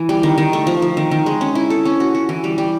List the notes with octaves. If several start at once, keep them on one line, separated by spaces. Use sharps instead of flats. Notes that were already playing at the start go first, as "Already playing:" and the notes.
Already playing: E3
G3
D#3
D#3
A3
F3
F3
D#3
D#3
G#3
C#4
E4
A4
C#4
F#4
F#4
E3
G3
G3